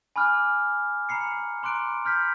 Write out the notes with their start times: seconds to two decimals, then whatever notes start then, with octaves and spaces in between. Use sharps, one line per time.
0.16 G#5 B5 D6 F6 F#6
1.09 A#5 B5 C7 C#7
1.63 A#5 C6 D6 F#6 D7
2.05 B5 F6 G6 B6